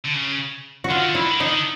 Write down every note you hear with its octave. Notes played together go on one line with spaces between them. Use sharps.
D3
C#3
F#4
D3 F4
D#3
D3
D#3 E4
D3
D#3
D3 D#4
D#3
D3